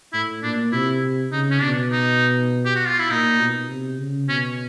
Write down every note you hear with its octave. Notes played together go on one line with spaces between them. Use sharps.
A2 E4
A#2 D4
C3 E4
C#3 D#4
C#4
B2 D4
D#4
G4
F#4
F4
E4
A#2 D#4
B2
C3
C#3
B2 C#4